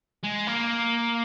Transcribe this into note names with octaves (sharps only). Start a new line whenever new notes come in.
G#3
A#3